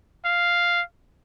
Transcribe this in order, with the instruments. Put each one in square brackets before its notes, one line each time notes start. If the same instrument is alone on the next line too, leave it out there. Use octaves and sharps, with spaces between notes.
[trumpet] F5